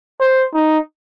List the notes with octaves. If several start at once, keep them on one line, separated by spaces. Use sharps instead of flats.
C5
D#4